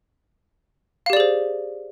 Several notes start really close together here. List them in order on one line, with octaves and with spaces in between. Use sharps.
F5 G4 D5 G#4 C5